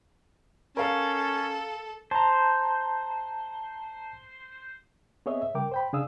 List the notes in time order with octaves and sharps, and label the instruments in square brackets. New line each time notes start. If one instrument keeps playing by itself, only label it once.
[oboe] C#4 [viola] A4 [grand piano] A#4 F5
[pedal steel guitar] C5 [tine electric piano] A5 A#5
[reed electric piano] B3 C4 G#4 C#5 D#5 E5
E5
C#3 G3 A#4 G5 D6
C5 G5 B5
C#3 D4 G#4 F5 D#6 E6